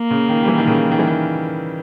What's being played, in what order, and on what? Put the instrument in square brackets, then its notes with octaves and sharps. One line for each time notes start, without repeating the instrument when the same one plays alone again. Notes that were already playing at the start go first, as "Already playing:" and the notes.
Already playing: [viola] A#3
[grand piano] C#3
D#3
G3
E3
D#3
C#3
D#3
E3
D#3